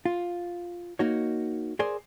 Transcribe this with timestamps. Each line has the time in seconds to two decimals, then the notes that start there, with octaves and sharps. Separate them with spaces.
0.06 F4
0.99 A#3 D#4 F#4 C#5
1.79 G#4 A#4 C5 D5 G#5 C6